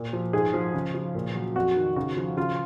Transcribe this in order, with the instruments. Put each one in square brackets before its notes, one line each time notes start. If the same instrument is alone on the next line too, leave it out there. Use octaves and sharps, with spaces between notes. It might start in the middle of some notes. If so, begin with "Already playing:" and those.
Already playing: [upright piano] A#2
F3
G#2 G#4
F3
C#3
F3
A#2
F#3
F2 F#4
D#3
C#3 F#4
F3
C#3 F4